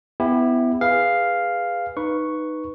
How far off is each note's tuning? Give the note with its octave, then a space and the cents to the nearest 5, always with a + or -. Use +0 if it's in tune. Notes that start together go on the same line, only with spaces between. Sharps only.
B3 +25 E4 +0 G4 +30
G#4 -15 B4 +0 F5 +0
D#4 -10 B4 +0 C#6 +0